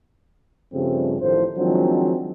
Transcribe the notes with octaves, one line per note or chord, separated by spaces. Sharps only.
G2 C#3 F3 G3 A3 C4
A1 A2 D#3 F3 C5
D#3 F3 F#3 G#3 C4 D4